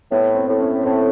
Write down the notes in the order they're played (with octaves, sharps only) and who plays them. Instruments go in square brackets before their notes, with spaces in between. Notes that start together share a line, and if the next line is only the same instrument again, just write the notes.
[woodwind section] A2 [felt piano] B3
[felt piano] C4
[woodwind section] A2
[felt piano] C#4
[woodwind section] A2 [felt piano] C4